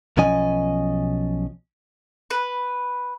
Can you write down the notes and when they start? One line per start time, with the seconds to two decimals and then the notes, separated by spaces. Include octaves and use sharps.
0.17 B1 B2 F3 C#4 D#5 G#5
2.30 B4